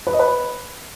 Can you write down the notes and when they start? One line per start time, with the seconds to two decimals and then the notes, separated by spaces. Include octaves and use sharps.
0.07 B4
0.13 D#5
0.19 B4